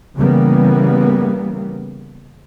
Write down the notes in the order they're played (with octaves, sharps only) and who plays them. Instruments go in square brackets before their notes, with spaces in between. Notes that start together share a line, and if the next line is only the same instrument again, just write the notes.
[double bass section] C#3 E3 G3 A#3 B3